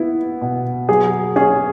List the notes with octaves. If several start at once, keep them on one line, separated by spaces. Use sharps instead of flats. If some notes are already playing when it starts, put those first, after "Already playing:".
Already playing: B3 E4
B2
F#3 G#4
C#4 G#4